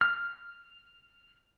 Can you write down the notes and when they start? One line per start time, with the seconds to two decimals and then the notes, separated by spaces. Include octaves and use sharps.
0.01 F6